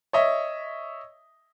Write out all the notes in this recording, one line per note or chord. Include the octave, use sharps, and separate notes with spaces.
C#5 D#5 E5